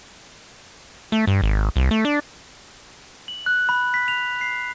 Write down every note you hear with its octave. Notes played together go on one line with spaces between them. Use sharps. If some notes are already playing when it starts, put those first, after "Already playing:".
A3
G2
G#1
C2
A3
D4
F#7
F#6
B5
B6
F7
C7